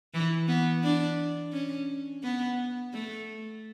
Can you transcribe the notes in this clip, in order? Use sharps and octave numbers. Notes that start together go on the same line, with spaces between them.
E3
B3
D4
C#4
B3
A3